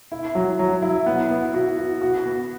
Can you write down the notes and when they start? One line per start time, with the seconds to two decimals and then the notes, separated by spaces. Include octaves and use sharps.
0.12 E4
0.35 F#3
0.59 F#3
0.82 E4
1.06 B3
1.30 B3
1.54 F#4
1.78 F#4
2.02 F#4
2.26 B3